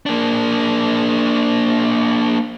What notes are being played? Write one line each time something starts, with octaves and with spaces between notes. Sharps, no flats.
A#3 D4